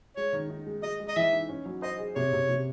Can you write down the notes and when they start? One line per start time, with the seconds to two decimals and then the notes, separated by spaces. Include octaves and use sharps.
0.16 G#3 C#5
0.33 D#3
0.50 D#4
0.67 G#3
0.83 G#3 D#5
1.00 G#3
1.08 D#5
1.16 E3 E5
1.33 D#4
1.49 C#4
1.66 F#3
1.82 C5 D#5
1.99 G#4
2.15 C3 C#5
2.33 C3
2.49 C3